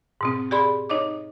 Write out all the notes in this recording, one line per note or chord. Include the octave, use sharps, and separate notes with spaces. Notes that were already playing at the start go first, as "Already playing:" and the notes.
G#2 B2 C4
G4 G#4 D5 B5 C6
D#4 C#5 D#5 D6